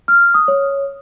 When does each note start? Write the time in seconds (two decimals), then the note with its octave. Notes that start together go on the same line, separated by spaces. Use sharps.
0.08 F6
0.34 D#6
0.48 C#5